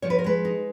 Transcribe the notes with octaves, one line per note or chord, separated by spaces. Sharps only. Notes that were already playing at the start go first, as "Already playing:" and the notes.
F3 C#5
B4
A#4
G#3 B4
D#4